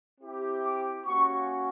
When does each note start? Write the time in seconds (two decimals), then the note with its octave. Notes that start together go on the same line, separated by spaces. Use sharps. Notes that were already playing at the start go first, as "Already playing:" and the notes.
0.20 C4 E4 G4
0.64 D6
1.05 A#3 C#4 F#4 C#6